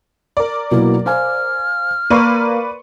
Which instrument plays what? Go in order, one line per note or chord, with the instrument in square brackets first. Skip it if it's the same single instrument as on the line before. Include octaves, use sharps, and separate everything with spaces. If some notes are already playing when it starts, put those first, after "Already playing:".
[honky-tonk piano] A#4 D5
[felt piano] B2 F#3 A#3 [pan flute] E4
[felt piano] C5 F5 G#5 [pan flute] F6
[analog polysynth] A#3 [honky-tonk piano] B4 D5 [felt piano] C6 C#6